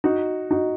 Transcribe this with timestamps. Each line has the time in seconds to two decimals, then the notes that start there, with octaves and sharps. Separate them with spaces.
0.04 D#4 F#4
0.51 D#4 F#4